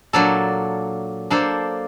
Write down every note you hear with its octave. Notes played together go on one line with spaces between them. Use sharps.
A#2 F#3 A#3 D4 A4
A#3 D4 A4 C5